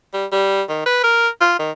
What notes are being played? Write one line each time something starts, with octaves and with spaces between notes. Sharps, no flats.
G3
G3
D#3
B4
A#4
F4
D#3